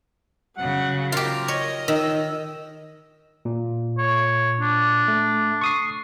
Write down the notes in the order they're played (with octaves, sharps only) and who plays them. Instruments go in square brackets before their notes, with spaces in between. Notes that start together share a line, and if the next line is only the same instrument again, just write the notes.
[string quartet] C#3 F#3 [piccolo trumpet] F#5
[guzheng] F4 G4 [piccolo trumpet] A#4
[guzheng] C#5 [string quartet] D#5
[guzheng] D#3 [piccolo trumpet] E6
[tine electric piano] A#2
[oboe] C#5
D4
[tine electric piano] A3
C#6 D#6 C7